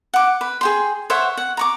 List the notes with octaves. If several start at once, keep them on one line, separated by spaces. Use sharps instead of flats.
F#5 D6
B4
G#4 G5 C6
C5 C#5 E5 F#5
F#5
A#5 C#6 D6